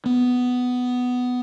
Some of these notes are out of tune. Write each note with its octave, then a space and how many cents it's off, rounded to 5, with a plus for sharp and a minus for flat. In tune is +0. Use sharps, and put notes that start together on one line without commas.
B3 +10